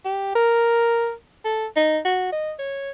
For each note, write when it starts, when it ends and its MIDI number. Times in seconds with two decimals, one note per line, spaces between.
0.05 0.34 67
0.35 1.12 70
1.45 1.66 69
1.76 1.99 63
2.05 2.30 66
2.33 2.53 75
2.59 2.91 73